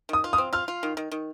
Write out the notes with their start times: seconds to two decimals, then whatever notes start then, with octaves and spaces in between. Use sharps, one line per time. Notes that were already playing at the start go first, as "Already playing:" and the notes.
0.09 D#3 D#6
0.24 F4
0.33 D#6
0.38 C4
0.53 F4 F6
0.68 F4
0.83 D#3
0.97 D#3
1.12 D#3